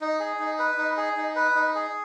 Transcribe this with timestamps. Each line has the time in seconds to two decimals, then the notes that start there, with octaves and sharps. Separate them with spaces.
0.01 D#4
0.20 G#4
0.40 D#4
0.59 B4
0.78 D#4
0.97 G#4
1.17 D#4
1.36 B4
1.55 D#4
1.75 G#4